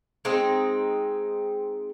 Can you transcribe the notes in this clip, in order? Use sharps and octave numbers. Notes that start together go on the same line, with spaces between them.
G#3 C4 D#4